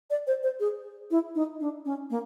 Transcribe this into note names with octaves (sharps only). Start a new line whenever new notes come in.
D5
C5
C5
G#4
E4
D#4
D4
C#4
A#3